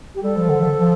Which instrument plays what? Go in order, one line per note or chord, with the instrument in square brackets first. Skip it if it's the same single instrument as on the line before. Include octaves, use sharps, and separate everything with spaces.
[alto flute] G4
[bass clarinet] G3 [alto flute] A4
[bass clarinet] F3
D3
F3
F3